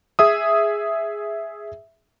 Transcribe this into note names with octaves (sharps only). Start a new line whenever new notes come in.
G#4 E5 D#6